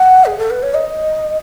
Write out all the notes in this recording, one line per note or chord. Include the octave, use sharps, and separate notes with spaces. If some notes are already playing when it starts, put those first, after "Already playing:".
Already playing: F#5
G#4
A4
B4
C#5
D#5